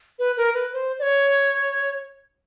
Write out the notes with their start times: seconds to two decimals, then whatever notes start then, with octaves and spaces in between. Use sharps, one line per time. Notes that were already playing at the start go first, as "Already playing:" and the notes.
0.19 B4
0.37 A#4
0.54 B4
0.73 C5
0.99 D5
1.02 C#5